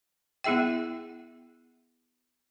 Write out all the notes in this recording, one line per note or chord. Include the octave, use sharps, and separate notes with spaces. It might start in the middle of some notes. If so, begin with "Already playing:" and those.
B3 E4 G#4 E5 G5